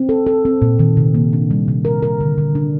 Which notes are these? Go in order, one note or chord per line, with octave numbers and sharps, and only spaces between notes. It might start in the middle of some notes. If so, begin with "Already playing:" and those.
Already playing: C4
A4
A4
C4
A#2
D#3
C3
A#3
D4
G3
C3
A#4
A#4
D3
D3
D4